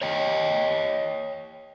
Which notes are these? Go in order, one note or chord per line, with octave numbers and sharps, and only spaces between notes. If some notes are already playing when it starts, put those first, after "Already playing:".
C#5 D#5 G5